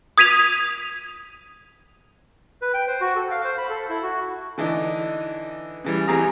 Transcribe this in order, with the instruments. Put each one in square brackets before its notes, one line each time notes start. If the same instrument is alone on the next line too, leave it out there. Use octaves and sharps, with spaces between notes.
[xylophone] D#6 G#6 B6 D#7 F7
[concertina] B4
G5
C5
F#4
A4
F5
C5
B5
A4
E4
F#4
[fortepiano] D3 E3 D4 D#4
C#3 E3 G3
F2 E3 G4 G#4 A#5 D#6